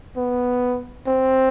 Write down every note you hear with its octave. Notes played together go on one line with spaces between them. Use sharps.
B3
C4